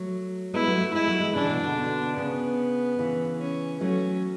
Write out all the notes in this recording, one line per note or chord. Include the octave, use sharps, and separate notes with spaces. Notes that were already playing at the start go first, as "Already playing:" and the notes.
Already playing: F#3 A3
G#3 B3 E4
F#3 A3
A3
G#3 E4
F#3
E3 G#3
C#3 E3 D4
B2
B2 D3
B2 D3
C#3 B3
C#3 E3
C#4
F#3 A3 C#4